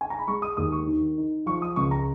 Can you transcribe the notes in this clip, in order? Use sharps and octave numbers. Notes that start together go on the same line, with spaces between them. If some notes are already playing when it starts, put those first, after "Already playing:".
G#5
A#5
B5
G#3 C#6
D#6
D#2 D#6
C#6
D#3
D#4
F3 C#6
D#6
C#2 C#6
A#5